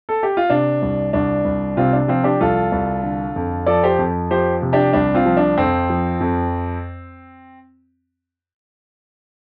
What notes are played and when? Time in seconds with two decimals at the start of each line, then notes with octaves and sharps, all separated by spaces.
0.09 A4
0.23 G4
0.37 F4
0.50 C3 D4
0.82 C2
1.13 C2 D4
1.45 C2
1.77 C3 C4 F4
1.93 D4
2.08 F3 C4 F4
2.24 D4 G4
2.40 C2 F4 A4
2.72 C2
3.03 D3
3.36 F2
3.66 F3 A4 D5
3.83 G4 C5
3.98 F2
4.31 F3 G4 C5
4.62 C3
4.73 D4 G4
4.93 C2 D4
5.14 C4 F4
5.26 F3
5.37 D4
5.57 F2 C4
5.90 F3
6.20 F2